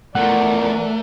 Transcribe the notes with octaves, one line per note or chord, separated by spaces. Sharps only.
E2 F3 A3 A#4 D5 F#5